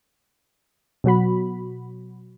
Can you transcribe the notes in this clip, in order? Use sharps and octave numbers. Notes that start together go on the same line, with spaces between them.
B2 F#3 F#4 B5